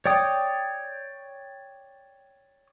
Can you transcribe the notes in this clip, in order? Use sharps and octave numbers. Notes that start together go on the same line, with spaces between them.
C#5 D5 G5 D#6